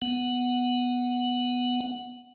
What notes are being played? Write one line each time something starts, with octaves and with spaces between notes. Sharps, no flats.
B3 F#5